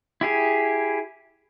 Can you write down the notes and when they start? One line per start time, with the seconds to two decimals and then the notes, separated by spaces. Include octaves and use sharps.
0.21 E4 G4 G#4